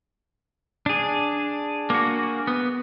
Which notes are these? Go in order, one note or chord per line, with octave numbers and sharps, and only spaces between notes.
D4 G#4
A#3 F#4
B3